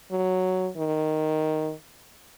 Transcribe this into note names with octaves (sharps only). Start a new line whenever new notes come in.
F#3
D#3